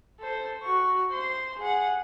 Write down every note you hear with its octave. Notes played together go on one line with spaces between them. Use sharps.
A4 C5
F#4 C#6
C5 C6
G#4 F#5